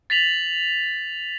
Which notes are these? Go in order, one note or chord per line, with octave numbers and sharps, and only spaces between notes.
A6 B6 F7 F#7